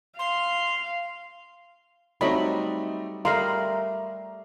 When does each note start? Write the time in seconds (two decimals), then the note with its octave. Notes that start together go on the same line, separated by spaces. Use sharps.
0.19 F5 C6
2.21 F#3 G3 A3 C4 D#4 C#5 D#5 B5
3.25 G3 A3 A#4 D#5 F5 A#5 C6